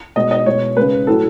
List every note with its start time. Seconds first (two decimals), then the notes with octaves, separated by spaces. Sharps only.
0.16 B2 G#3 D#5
0.31 D#5
0.46 B2 G#3 C#5
0.77 C#3 G#3 B4
1.07 A2 F#3 A4